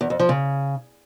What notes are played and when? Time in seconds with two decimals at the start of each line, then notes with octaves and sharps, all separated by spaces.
0.01 E2
0.10 F2
0.20 F3
0.29 C#3